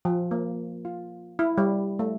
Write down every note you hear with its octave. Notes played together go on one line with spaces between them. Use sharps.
F3
A#3
F4
E4
G3
A3